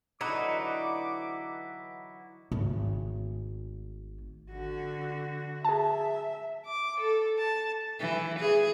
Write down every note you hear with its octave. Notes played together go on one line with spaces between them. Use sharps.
D3 E3 F#3 D#4 E4 F#4 B4 D6
G#1 A3
D3 F#4
G#4 E5 A5
D6
A4
A5
E3
G#4